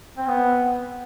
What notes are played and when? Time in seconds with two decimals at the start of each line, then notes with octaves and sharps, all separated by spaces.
0.17 C4
0.27 B3